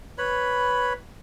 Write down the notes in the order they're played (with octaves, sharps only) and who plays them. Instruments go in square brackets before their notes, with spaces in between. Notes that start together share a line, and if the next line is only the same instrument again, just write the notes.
[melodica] B4 C#5 B5